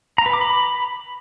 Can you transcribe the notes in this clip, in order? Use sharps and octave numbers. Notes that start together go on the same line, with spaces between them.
A#5
B4
D6
B5